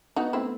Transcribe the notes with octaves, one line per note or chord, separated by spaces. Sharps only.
B3 D#4 F#4
A3 C4 E4